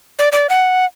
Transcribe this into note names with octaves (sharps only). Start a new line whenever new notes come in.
D5
D5
F#5